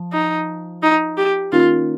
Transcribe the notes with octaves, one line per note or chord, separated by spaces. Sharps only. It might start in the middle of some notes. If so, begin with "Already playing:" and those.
Already playing: F3
D#4
D#4
G4
D#3 A#3 C#4 F4